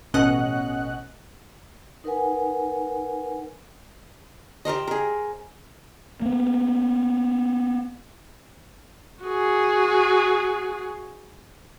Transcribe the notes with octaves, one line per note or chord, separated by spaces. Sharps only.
A1 B2 C#4 D#5 F#5 F#6
D#4 A#4 B4 F#5 G#5
G4 A#4 C5 D#5
G#4 A#4
A#3 B3
F#4 G#4